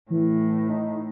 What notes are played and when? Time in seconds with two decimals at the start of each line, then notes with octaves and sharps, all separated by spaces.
0.10 A2 E3
0.69 D#4